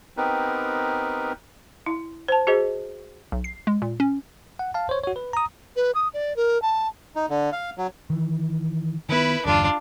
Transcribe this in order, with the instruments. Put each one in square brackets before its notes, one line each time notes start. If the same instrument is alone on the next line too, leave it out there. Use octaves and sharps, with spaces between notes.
[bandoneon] B3 C4 D#4 G4 A#4 B4
[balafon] E4
C5 A5
F#4 G#4 C5 D#5
[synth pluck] B1
C7
G#3
A#2
C#4
[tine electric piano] F#5
F5 A5
C5 C#5
F#4 C#5
B4
A#5 D#6
[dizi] B4
D#6
D5
A#4
A5
[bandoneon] D#4
D3
F5
F#3
[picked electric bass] D#3 E3
[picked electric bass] D#3 B3 [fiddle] E4 B4
[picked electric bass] G1 E2 G3 [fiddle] D4 F4